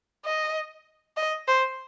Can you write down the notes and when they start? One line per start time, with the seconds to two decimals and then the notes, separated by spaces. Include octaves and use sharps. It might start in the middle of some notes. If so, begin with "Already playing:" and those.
0.25 D#5
1.17 D#5
1.47 C5